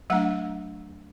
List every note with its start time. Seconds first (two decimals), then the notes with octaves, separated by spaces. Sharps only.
0.10 F#3 A3 D4 F#5